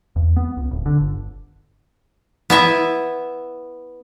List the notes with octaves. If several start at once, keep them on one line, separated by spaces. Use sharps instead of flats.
E2
B3
C#2
D1
D3
G1
B3 E4 E5